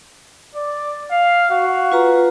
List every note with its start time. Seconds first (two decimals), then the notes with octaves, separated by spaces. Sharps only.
0.55 D5
1.11 F5
1.51 F#4
1.92 F4 B4 A#5